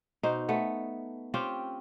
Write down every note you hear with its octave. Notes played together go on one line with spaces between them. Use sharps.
B2 D#4 C5
A3 B3
C4 C#4 F4 G4